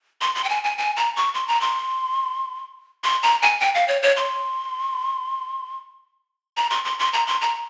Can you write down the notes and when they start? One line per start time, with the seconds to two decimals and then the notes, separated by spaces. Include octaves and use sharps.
0.21 C6
0.35 C6
0.44 G5
0.49 G#5
0.64 G#5
0.78 G#5
0.97 A#5
1.16 C#6
1.34 C6
1.48 A#5
1.61 C6
3.04 C6
3.23 A#5
3.42 G#5
3.60 G5
3.75 F5
3.88 C#5
4.03 C#5
4.16 C6
6.57 A#5
6.71 C6
6.85 C6
6.99 C6
7.13 A#5
7.27 C6
7.41 A#5